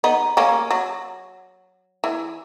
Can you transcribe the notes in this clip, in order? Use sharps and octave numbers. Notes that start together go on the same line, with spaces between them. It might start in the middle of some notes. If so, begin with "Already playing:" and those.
B3 D#4
A#3 C#4
F#3
E3